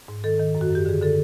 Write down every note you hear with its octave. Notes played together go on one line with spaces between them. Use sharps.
G#2
D#3 A4
D#3
F#2
F#4
F#2 G4
D3 G#4
D3 A4